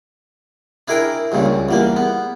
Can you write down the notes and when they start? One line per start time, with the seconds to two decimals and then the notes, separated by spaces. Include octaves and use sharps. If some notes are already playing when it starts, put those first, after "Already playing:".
0.88 D4 E4 G#4 A#4 G5
1.32 C#2 G2 A#2 C#3
1.46 C#2
1.69 E2 G3 A#3
1.96 B3